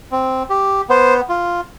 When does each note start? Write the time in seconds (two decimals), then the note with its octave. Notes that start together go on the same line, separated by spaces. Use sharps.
0.12 C4
0.50 G4
0.89 B3 C5
1.29 F4